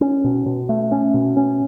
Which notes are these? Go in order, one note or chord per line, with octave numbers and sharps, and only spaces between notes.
C#4
B2
B2
A3
C#4
B2
C#4